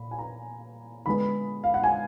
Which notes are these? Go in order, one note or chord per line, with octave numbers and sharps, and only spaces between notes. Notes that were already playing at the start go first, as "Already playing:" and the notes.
Already playing: A#2 B5
G#5
A#5
D3 G#3 B3 B5
F5
F#5
G#5